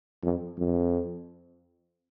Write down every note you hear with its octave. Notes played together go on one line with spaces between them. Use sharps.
F2
F2